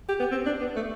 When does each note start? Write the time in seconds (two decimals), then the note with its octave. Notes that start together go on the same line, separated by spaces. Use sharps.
0.09 G4
0.20 B3
0.31 C4
0.46 D4
0.61 B3
0.76 A3